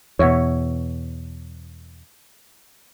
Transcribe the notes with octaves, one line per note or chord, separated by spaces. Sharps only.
E2 B2 C#5 E5 F#5